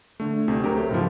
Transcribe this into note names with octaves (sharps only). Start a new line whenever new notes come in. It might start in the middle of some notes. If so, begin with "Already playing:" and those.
D3 A3
D2 C3
F#3 G4 A#4
A3
C#2 G#2 F3